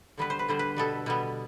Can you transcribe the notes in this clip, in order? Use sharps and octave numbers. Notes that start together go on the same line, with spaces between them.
D3 G3 B3 B4
C5
B4
D3 G3 B3 C5
B4
B2 G3 B3 A4
B2 G3 B3